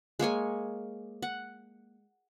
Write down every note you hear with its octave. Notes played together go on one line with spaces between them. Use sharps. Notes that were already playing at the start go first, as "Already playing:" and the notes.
G#3 A#3 C#5 G#5
F#5